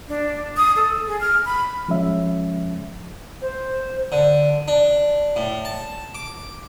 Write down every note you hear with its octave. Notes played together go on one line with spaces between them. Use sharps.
D4
D#6
A4
G#4
F6
B5
F3 G#3 C#4 E5
C5
D3
D4
A2
A5
D6